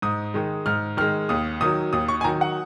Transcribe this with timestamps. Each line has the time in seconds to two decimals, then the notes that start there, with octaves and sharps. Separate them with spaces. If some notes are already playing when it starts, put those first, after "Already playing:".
0.02 G#2 D#6
0.34 D#3 G#3
0.66 G#2 F6
0.97 D#3 G#3 F6
1.29 D#2 D#6
1.61 D#3 F#3 D#6
1.93 D#2 D#6
2.08 C#6
2.21 G#5
2.24 D#3 F#3 A#5
2.41 F#5